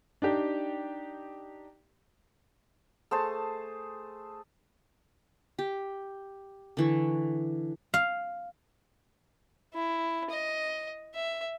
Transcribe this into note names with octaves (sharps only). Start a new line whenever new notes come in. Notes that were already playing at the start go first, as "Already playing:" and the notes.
D4 D#4 G4
A3 G#4 C5 A5
G4
D3 E3 C#6
F5
E4
D#5
E5